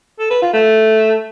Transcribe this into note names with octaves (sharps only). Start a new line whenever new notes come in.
A4
B4
F4
A3